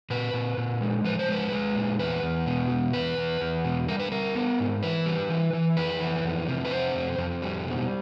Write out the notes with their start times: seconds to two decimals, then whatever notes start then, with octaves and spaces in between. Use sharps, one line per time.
0.10 A#2 B4
0.33 A#2
0.57 A#2
0.81 G#3
1.04 F3 B4
1.19 C5
1.29 G#3 B4
1.52 G#3
1.75 A#2
1.99 E2 B4
2.23 E2
2.46 B2
2.70 E2
2.93 E2 B4
3.17 E2
3.41 E2
3.65 B2
3.88 G3 A#4
4.00 B4
4.12 G3 A#4
4.35 B3
4.59 G#2
4.83 E3 B4
5.06 G3
5.30 E3
5.53 E3
5.77 F2 B4
6.00 E3
6.24 F2
6.48 C3
6.65 B4
6.71 F2 C5
6.95 F2
7.18 F2
7.42 G3
7.66 B2